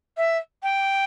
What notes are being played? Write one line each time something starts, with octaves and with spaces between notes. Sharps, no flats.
E5
G5